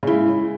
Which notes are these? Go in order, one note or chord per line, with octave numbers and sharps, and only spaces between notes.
C#3 G#3 E4